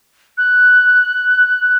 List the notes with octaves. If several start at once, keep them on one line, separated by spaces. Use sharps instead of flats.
F#6